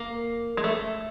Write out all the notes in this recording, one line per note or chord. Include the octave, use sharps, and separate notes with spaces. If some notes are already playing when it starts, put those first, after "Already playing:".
Already playing: A#3
G#3
A3